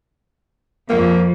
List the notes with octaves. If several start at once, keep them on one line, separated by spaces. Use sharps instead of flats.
F2 A#3